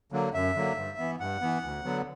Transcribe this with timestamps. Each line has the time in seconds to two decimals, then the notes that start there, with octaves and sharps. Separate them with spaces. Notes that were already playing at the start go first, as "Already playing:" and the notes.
0.12 D3 F#3 A#3
0.34 F#2 E5
0.55 D3 F#3 A#3
0.76 G2
0.98 E3 B3
1.20 G2 F#5
1.41 E3 B3
1.63 D2
1.84 D3 F#3 B3